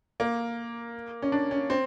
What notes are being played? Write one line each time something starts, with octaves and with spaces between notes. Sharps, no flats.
A#3
C#4
D4
C#4
C4